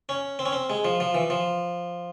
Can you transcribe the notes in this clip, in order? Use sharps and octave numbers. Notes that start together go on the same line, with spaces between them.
C#4
C4
C#4
C4
G#3
F3
F3
E3
F3